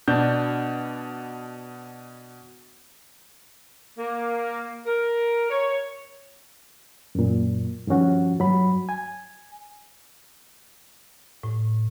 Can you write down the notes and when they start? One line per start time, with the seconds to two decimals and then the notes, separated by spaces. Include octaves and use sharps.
0.08 B2 D4 G6
3.97 A#3
4.86 A#4
5.50 C#5
7.15 F#2 A#2
7.87 G2 D#3 F3 C#4 F#4
8.39 G2 F#3 B5
8.89 G#5
11.43 A2